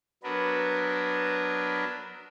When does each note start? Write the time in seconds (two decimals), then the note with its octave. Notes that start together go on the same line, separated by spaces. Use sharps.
0.23 F#3 B3 D4 A#4 B4